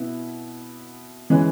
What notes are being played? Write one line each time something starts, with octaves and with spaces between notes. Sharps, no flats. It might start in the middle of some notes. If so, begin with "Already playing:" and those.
Already playing: B2 B3 E4
E3 G#3 C#4